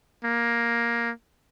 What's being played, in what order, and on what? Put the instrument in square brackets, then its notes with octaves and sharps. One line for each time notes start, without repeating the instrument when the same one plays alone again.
[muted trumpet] A#3